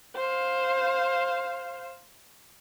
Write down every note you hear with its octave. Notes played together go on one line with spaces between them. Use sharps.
C5 F5